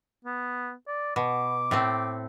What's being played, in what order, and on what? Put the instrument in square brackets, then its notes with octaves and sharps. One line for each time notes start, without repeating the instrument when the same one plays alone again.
[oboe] B3
D5
[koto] B2 [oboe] D6
[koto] A2 A3 C4